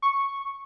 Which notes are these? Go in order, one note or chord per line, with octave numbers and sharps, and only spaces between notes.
C#6